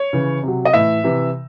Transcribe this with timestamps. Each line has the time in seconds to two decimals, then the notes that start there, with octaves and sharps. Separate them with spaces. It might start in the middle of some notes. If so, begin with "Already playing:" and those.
Already playing: C#5
0.13 C#3 E3
0.43 C3 F#3
0.65 D#5
0.73 A2 E3 E5
1.04 C3 E3